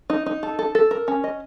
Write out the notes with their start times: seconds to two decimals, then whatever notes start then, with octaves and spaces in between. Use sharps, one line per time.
0.10 D#4
0.26 D#4
0.43 A4
0.59 A4
0.75 A4
0.91 A#4
1.08 C#4
1.24 D#5